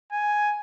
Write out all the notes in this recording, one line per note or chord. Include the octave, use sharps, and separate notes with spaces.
G#5